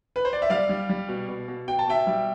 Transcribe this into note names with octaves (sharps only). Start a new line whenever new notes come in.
B4
C5
D5
E5
G3 D5 F5
G3
G3
B2
B2
B2
B2 G5
A5
B2 E5 G5
G3